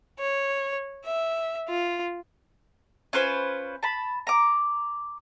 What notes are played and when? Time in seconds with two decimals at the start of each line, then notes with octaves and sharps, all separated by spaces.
0.19 C#5
1.05 E5
1.69 F4
3.13 C#4 F4 B4 C5
3.83 A5 B5
4.27 A#5 D6